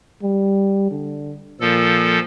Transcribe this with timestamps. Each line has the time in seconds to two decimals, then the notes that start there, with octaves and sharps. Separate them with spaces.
0.23 G3
0.91 D3
1.61 A#2 F3 A4